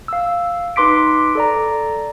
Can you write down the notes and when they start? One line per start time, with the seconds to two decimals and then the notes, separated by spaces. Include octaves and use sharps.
0.08 F5 E6
0.76 D#4 B4 C6 D6 B6 D7
1.35 A4 D5 A#5